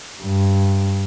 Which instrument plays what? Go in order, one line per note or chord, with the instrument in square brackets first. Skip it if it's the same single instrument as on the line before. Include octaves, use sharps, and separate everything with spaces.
[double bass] G2